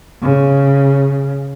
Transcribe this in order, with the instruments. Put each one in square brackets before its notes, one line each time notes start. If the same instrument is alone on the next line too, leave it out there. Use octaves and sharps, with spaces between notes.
[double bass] C#3